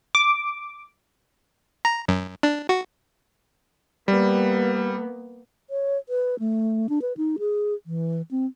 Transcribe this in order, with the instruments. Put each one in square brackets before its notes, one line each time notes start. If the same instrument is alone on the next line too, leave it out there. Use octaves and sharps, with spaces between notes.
[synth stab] D6
[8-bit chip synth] A#5
F#2
D4
F#4
[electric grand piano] G3 [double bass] A#3 B3
[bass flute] C#5
B4
A3
D4
B4
D#4
G#4
E3
C4